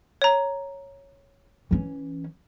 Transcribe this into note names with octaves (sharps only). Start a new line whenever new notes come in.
C#5 A#5
E3 C#4